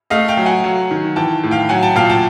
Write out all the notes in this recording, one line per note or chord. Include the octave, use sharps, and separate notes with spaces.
A3 D#5 F5
F5 G5
F#3
F#5 G#5
F#3
D#3
E3 G5 A5
A2
F5 G5
F#3 F#5 G#5
G5 A5
A#2 F5 G5
G5 A5